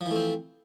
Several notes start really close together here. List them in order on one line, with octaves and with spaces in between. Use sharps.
F3 E3 A3 C4